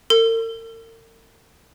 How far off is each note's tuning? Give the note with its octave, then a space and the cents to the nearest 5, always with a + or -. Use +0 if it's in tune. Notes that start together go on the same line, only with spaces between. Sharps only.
A#4 -45